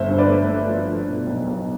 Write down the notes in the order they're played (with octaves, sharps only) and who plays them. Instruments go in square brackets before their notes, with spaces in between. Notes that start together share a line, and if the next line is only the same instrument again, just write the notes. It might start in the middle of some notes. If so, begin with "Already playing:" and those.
Already playing: [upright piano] G1 C5 E5
G2
B4 D5
A3
A3
F3
F3
B2
B1
B1